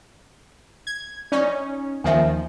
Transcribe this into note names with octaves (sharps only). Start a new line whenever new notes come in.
G#6
C#4 D#4 D5 C#6
D#2 D#3 F3 E5 G#5